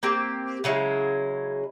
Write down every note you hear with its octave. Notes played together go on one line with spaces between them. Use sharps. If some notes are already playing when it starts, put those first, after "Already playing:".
A#3 C4 G4
C#3 F#3 G#3 E4